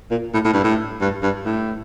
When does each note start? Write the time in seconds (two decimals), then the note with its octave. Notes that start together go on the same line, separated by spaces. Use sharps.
0.11 A#2
0.34 A2
0.44 A2
0.54 G2
0.64 A2
1.01 G2
1.23 G2
1.46 A2